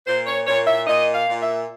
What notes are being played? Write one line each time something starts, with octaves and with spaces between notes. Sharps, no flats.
A#2 C5
C#5
A#2 C#5
E5
A#2 D#5
F5
A#2
E5